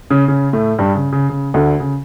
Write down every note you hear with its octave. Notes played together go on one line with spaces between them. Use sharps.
C#3 C#4
C#3 C#4
A2 A3
G2 G3
C#3
C#3
C#3
D2 D3
C#3